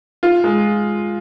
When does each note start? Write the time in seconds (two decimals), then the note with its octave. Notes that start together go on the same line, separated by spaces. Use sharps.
0.23 F4
0.44 G#3